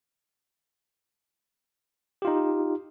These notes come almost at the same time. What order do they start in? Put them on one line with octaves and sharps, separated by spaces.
G4 F4 D#4